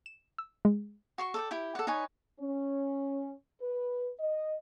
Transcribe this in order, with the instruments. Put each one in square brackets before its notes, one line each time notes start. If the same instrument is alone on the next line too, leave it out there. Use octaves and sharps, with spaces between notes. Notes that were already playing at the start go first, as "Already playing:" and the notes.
[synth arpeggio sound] E7
E6
G#3
[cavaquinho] F#4 C6 C#6
A4 D5 G5
E4 G4 G5
A4 D5 F#5
D#4 B4 C#5 G#5
[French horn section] C#4
B4
D#5